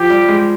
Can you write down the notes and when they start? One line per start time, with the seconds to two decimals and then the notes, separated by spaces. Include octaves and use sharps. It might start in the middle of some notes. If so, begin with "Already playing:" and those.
Already playing: F3 G4
0.10 G3
0.28 G#3